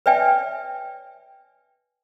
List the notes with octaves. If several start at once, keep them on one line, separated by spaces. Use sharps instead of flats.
B4 C#5 D5 E5 G5 G#5